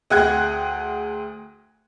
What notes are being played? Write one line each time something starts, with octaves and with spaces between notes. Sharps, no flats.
D2 G#4 F#5 G5 F#6 G#6